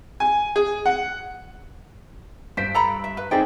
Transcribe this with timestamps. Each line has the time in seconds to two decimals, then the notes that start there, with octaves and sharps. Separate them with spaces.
0.20 G#5
0.56 G#4
0.86 F#5
2.57 G2 C5 B6 D7
2.74 A4 A#5 B5
3.04 E5
3.17 B4
3.31 C4 D#4 G#4 D5 E5 G5